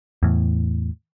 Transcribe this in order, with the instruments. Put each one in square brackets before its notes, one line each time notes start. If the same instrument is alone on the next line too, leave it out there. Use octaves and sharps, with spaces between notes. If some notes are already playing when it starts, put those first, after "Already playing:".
[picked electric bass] E2 A2